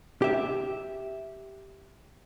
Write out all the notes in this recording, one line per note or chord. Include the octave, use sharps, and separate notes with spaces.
G4 E5